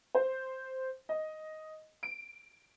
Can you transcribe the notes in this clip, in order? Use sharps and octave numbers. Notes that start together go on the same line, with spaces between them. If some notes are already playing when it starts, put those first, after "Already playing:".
C5
D#5
D7